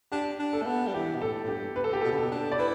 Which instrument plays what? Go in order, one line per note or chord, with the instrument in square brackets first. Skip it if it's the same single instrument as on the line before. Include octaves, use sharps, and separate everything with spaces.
[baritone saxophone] D4 [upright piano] G4
[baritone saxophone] D4
[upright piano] A4
[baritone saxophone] A3
B3
G3
[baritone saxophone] E3 [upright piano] G4
[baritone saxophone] B2
[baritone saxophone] A2 [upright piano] A4
[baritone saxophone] A2
[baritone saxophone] G2 [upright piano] G4
[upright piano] B4
A4
G4
[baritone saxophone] B2 [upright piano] A4
[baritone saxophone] D3
[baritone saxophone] B2 [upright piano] A4
[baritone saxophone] D4
[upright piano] D5
[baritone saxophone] E4 [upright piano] B4